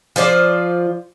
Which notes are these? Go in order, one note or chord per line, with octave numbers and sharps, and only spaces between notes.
F3 F4 C5 D5